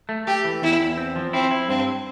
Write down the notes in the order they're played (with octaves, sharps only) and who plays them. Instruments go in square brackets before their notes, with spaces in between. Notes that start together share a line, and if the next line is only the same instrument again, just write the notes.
[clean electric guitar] A3
[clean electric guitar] A3 [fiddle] G4
[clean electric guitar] E3
[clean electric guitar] E2 [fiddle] E4
[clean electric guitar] E2
C4
F3
[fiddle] C4 [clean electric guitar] E4
[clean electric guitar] E4
[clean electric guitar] G2 [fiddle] C4